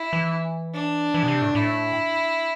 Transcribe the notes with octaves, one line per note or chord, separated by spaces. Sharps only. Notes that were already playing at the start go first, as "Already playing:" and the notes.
Already playing: E4
E3
D4
E3
B2
C3
A2
A2 E4